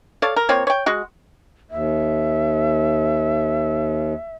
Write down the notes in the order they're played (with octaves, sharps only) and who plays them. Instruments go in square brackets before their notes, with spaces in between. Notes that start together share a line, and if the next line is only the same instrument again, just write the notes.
[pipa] A4 C#5 D5 F5
A#4
F3 A#3 C4 C#5
C#5 G5
G#3 F#4
[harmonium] D#2 [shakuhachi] E5